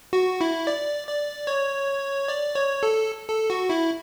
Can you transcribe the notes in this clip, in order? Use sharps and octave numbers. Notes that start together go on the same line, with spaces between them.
F#4
E4
D5
D5
C#5
D5
C#5
A4
A4
F#4
E4